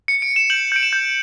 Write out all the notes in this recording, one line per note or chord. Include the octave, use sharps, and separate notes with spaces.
C#7
D7
E7
G6 F#7
G6 D7
E7
G6